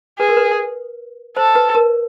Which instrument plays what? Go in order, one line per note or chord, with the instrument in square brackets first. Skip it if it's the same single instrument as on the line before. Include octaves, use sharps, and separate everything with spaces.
[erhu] G#4 [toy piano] B4
[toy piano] A#4
B4
[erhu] A4 [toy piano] C5
[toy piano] B4
A#4